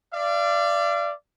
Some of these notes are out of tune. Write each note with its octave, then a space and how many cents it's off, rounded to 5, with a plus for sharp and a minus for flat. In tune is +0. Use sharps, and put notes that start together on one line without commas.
D5 +0 F5 -40